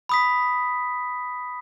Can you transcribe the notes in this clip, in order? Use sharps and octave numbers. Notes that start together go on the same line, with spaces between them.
B5 D#6 B6